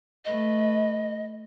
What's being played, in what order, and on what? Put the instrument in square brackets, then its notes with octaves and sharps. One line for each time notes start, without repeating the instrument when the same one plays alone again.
[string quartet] A3 B4 [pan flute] D#5